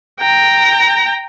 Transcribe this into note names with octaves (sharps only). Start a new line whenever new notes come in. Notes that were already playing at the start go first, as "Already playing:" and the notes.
G5 A#5